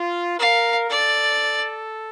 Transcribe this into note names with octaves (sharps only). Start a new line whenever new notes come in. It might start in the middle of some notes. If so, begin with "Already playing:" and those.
Already playing: F4
A#4 F5
A4 D5